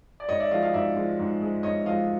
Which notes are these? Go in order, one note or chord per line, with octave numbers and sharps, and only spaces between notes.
D5
G#2 C#5 D#5
D5 E5
F3 G#3 D#5 F5
D#5 F5
G#2 D5 E5
F3 G#3
G#2
F3 G#3
G#2 C#5 D#5
F3 G#3 D#5 F5